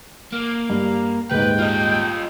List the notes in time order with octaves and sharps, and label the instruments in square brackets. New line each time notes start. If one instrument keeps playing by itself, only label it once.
[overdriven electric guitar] A#3
[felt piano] G2
[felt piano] D#1 G#2 [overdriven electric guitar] B4 [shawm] G5
[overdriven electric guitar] F4 D#5